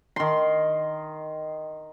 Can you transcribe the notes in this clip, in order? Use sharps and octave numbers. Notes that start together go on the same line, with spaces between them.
D#3 C6